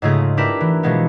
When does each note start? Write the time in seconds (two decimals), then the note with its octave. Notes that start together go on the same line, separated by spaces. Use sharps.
0.02 G#2 C#3 G#3 A3 F4 G#4
0.37 D4 E4 G4 A#4 B4 E5
0.61 E3
0.83 B2 F3 G#3 A#3 B3